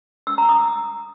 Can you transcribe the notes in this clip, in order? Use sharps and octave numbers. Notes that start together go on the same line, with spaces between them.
E6
A#5
D#6
E6